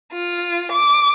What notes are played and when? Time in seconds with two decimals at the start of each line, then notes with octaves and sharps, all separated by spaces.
0.12 F4
0.72 D6